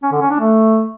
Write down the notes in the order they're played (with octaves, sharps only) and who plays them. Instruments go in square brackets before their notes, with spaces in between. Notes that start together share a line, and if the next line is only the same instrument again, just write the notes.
[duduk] C#4
D3
C#4
D4
A3